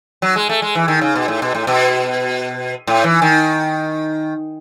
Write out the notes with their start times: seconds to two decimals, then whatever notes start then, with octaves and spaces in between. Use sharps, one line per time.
0.22 F#3
0.36 G#3
0.49 A3
0.62 G#3
0.75 E3
0.88 D#3
1.01 C#3
1.15 B2
1.28 A2
1.42 B2
1.55 A2
1.67 B2
2.87 A2
3.04 E3
3.22 D#3